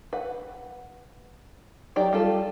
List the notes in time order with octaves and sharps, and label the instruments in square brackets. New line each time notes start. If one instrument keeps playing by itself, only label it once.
[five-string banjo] B4 F#5
F#3 D#4 G4 D5
G3 F4 A4